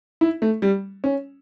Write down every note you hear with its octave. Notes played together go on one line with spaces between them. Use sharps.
E4
A3
G3
C#4